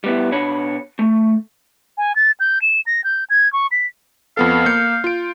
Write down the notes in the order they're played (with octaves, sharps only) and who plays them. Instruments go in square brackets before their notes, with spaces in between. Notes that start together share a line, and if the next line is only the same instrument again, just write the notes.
[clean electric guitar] G3 B3 E4
B2 D4 C#5 B5
A3
[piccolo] G#5
A6
G6
E7
A#6
G6
G#6
C#6
B6
[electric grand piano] F2 B3 A4 [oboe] F5
[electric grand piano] A#3 G6 C#7
F4 D7